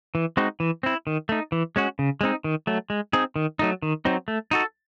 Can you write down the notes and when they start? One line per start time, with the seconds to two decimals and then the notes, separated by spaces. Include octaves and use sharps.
0.15 E3
0.37 G#3 C4 D#4 F#4
0.60 E3
0.83 C4 E4
1.07 D#3
1.29 A3 D#4
1.52 E3
1.76 G#3 C#4 F#4
1.99 C#3
2.21 G#3 C4 D#4
2.44 D#3
2.67 F#3 A3
2.90 G#3
3.13 C4 D#4 G#4
3.36 D#3
3.59 F#3 A3 D#4
3.82 D#3
4.05 F#3 C4 D#4
4.28 A3
4.51 D#4 F#4 A4